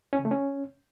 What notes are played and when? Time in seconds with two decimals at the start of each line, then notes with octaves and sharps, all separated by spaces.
0.13 C#4
0.19 C#3
0.25 A3
0.31 C#4